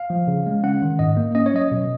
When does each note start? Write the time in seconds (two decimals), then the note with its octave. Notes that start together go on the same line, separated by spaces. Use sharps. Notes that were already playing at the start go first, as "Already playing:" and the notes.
Already playing: F5
0.10 F3
0.28 C#3
0.46 G#3
0.64 C#4 F#5
0.82 D#3
0.99 G#2 D#5
1.17 A#3
1.35 C#4 D#5
1.46 C#5
1.54 F#3 D#5
1.72 B2